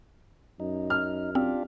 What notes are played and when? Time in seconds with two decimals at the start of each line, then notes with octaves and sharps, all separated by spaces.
0.60 F#2 D#4
0.90 F6
1.35 C4 D4 F4 G4